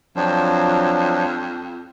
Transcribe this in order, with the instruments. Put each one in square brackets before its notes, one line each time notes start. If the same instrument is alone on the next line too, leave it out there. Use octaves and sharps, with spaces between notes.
[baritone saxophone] F2 [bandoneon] F3 F#3 D4